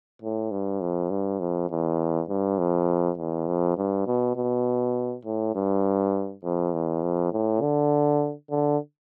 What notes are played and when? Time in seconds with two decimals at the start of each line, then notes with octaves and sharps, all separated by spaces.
0.22 A2
0.51 G2
0.81 F2
1.10 G2
1.40 F2
1.70 E2
2.29 G2
2.58 F2
3.18 E2
3.47 F2
3.77 G2
4.07 B2
4.36 B2
5.25 A2
5.55 G2
6.44 F2
6.73 E2
7.03 F2
7.33 A2
7.62 D3
8.51 D3